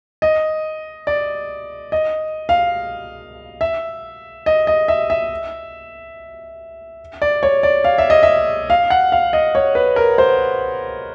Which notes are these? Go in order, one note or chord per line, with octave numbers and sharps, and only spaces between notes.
D#5
D5
D#5
F5
E5
D#5
D#5
E5
E5
D5
C#5
D5
F5
E5
D#5
E5
F5
F#5
F5
D#5
C#5
B4
A#4
C5